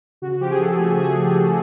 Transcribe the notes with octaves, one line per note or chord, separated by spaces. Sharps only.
C#3 F#4
F#4
F3 G4
G#4
C#3 A4
A3
C#3 G#4
F3
G4
A3